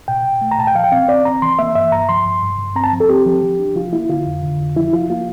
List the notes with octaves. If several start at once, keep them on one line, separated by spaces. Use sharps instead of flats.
A#2 G5
A#2
A3
A#5
A#2 A5
G5
F3 F5
G5
C4 F5
C4 D5
C4 A#5
E3 C6
A#3 E5
G2 E5
G2 A#5
F3 C6
G2
G2
G2
C4 A#5
A5
F3
A4
C4 G4
F3
F3
D4
F3 F4
A#3 E4
D3 F4
F2
D3
F2
F3 E4
F3 F4
A#3 F4